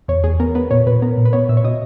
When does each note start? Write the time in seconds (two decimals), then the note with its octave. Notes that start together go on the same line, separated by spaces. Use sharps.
0.08 E2 C#5
0.24 E2 G#4
0.40 B3 A#4
0.55 B3 B4
0.71 A#2 C#5
0.87 A#2 B4
1.02 B3 A#4
1.18 A#2
1.25 B4
1.33 B3 C#5
1.49 A#2 E5
1.57 C#5
1.64 B2 D#5